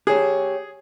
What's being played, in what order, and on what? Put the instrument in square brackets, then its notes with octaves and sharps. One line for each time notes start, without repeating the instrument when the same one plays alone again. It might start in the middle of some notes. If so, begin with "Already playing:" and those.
[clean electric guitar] G4 C#5 [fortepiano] G#4